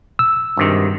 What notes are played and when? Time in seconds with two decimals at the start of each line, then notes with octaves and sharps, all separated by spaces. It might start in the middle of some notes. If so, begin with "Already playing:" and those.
0.19 E6
0.57 G#1 G2 C3 D#3